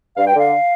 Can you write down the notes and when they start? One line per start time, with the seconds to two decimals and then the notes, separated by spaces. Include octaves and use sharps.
0.17 G2 F5
0.27 G5
0.34 D3 F5